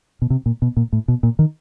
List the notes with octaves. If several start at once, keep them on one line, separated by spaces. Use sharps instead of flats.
B2
C3
A#2
B2
A#2
A2
B2
A#2
D#3